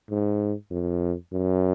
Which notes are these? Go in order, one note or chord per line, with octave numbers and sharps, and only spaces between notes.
G#2
F2
F#2